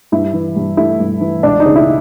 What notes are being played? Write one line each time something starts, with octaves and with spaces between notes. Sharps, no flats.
G2 E4
E3
G2
A3 E4
G2
E3
C#2 D4
D#4
C#3
E4